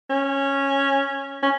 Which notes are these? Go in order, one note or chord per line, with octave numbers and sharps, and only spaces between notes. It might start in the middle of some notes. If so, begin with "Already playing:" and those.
C#4
C#4